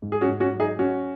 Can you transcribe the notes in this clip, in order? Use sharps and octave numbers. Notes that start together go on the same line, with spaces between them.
G#2
G#4
C#4 F#4
G#2
C#4 F#4
F#3
D#4 G#4
F#3 C#4 F#4